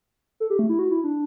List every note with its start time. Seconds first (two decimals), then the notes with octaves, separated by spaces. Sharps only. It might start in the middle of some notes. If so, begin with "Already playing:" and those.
0.40 A4
0.50 G4
0.59 A3
0.69 E4
0.79 F#4
0.91 E4
1.04 D4